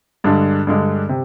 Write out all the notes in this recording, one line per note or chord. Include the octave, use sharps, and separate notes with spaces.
G2 D3 G#3 D4
G2 D3 G#3 D4
C3